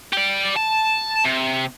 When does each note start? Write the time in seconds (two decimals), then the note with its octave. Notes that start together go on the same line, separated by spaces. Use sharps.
0.13 G4 D5
0.57 A5
1.25 C3